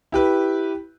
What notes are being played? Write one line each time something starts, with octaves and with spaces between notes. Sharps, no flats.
E4 G4 B4